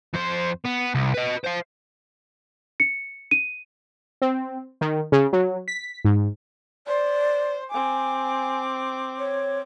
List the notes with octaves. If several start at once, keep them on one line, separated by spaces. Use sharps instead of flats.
F2 C5
B3
C2
B4 D#5
C5 F5
C#7
D#7
C4
D#3
C#3
F#3
B6
G#2
C5 D5
C4 G#5 D6
C#5